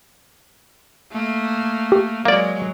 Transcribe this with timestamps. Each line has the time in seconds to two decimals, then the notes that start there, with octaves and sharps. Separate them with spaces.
1.12 A3 A#3
1.92 G4
2.25 F#3 G#3 A#3 D5